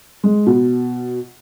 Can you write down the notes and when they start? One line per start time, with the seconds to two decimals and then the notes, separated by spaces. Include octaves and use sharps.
0.23 G#3
0.46 B2